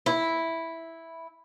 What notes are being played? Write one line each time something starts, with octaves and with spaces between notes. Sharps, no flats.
E4